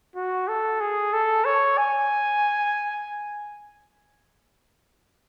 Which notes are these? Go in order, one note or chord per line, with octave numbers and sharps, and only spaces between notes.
F#4
A4
G#4
A4
C#5
G#5